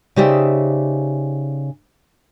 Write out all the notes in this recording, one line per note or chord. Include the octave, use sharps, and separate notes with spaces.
C#3 D#4 G4 C5 D5 E5